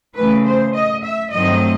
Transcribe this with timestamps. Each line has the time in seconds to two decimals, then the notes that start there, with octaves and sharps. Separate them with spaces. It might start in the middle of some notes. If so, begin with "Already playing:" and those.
0.15 C#3 E3 A3 B4
0.45 C5
0.73 D#5
1.03 E5
1.32 G2 D#3 F#3 A3 C4 D#5